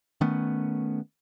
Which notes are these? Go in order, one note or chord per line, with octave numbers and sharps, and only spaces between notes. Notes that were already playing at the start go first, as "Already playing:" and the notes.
D#3 A3 B3 C#4